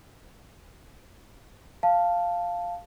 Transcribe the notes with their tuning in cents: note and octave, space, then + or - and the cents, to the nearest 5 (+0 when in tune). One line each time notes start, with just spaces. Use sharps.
F5 +0 A5 +0